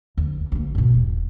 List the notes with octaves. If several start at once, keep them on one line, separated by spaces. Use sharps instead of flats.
D2
D2 A#3
G#2 B2
D#1